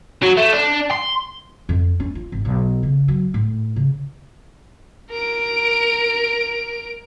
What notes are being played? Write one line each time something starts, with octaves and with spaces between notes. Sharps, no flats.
F#3
A3
D4
C6
F2
C#4
F4
G#1
B1
C#3
F#3
A2
C#3
A#4 D7